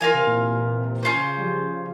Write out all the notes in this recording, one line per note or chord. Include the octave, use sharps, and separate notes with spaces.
E3 F4 A#4 F5 G#5
C3
A#2
C3
A#2
A#2
C3
A#2
C#4 F4 C5
C#3
C#3
G3
F3
C#3